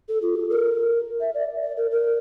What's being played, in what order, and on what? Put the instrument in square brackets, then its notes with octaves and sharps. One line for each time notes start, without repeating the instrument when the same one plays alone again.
[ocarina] A4
F4
A4
A#4
E5
D5
D5
A#4
A#4